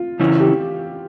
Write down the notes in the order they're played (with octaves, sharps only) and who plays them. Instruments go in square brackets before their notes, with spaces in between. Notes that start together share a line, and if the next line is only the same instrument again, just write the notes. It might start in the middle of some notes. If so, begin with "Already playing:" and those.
Already playing: [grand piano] F4
[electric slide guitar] C#3 E3 C#4 E4
[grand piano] G4